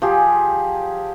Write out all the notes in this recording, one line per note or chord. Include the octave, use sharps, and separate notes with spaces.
F3 G4 G#4